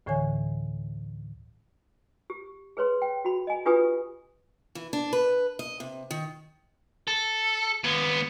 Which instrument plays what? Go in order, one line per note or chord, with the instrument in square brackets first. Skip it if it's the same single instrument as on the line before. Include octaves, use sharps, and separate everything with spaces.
[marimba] D2 A2 D3 E3 C#5 G#5
[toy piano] G4
G#4 B4 C#5 C6
G5
F#4 B5
D#5 G#5
D4 F4 G4 B4 G#5 D#6
[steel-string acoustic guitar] E3
D4
B4
D#5
C3
D#3
[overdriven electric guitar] A4
D#2 B3